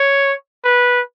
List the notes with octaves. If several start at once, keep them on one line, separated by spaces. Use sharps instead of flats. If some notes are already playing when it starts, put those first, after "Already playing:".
Already playing: C#5
B4